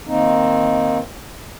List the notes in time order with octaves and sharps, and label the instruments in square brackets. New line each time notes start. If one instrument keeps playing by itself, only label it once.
[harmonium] D#3 A#3 C4 D#4